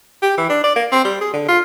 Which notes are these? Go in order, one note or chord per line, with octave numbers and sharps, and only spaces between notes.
G4
E3
D4
D5
A#3
C4
G3
G#4
D3
F4